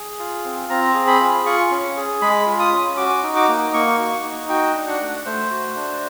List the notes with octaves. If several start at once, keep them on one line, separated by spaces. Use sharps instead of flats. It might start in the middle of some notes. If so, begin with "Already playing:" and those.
Already playing: G#4
F4
C4
C4 A#5
G#4
B5
F4
F4 C#6
C#4
G#4
G#3 B5
F4
D#6
C#4
F#4 D6
D#4
D6
A#3
A#3 C#6
F#4
D#4
F#4 G5
D4
F#5
A3
A3 C5
F#4
D4